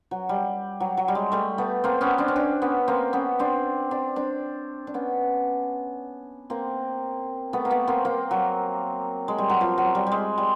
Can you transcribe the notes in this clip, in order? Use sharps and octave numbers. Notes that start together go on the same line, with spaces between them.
F#3
G3
F#3
F#3
G3
G#3
G3 A3
A3 B3
A#3 C4
B3 C#4
C4 D4
C#4
C4 D4
B3 C#4
A#3 C4
B3 C#4
C4 D4
C4 D4
C4 D4
D4
B3 C#4
A#3 C4
A3 B3
A#3
A3 B3
A#3 C4
A#3 C4
F#3
G#3
G3
F#3
F3
F#3
G3
G3 G#3
G3